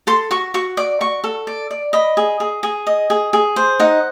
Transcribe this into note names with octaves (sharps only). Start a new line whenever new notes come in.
A4 C6
F#4 C#6
F#4 C#6
D5 D6
F#4 C#6
A4
D5
D5
D#5 B5
G#4
G#4
G#4
D#5
G#4
G#4
C5
D#4 F#5